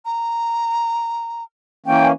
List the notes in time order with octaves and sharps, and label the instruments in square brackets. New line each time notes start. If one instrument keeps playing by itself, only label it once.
[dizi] A#5
[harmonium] E3 A#3 C#4 [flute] G5